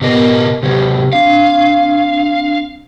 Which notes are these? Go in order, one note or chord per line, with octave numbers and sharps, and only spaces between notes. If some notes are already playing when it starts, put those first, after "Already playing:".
B2 B3 G4 A#4 D#5
C3 F#3 G4
C4 D4 F5